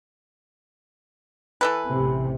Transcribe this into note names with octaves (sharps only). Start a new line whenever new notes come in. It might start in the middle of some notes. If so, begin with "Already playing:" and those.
E3 A4 B4
A1 C3